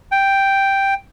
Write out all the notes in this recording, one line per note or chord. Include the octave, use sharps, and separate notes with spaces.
G5